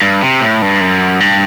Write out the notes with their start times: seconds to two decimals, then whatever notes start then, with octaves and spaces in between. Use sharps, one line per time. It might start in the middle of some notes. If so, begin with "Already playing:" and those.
0.02 G2
0.22 C3
0.41 A2
0.62 G2
0.81 F#2
1.20 G2